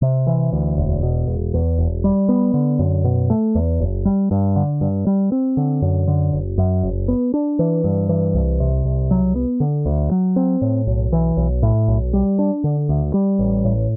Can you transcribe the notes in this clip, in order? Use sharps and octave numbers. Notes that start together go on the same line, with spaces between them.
C3
E3
D2
E1
B2
E1
E2
E1
G3
B3
D3
F#2
B2
A3
E2
F#1
G3
G2
D3
G2
G3
C4
D3
F#2
D3
F#1
F#2
F#1
B3
D4
E3
G2
E3
C2
C3
C2
F#3
B3
D3
D2
F#3
C4
A2
B1
E3
B1
A2
B1
G3
D4
D3
D2
G3
A1
A2